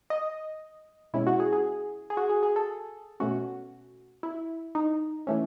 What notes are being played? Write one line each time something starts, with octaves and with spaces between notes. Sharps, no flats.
D#5
B2 G#3 C#4 E4
F#4
G#4
G#4
G#4
F#4
G#4
G#4
A4
B2 A3 C#4 F#4
E4
D#4
E3 A3 C#4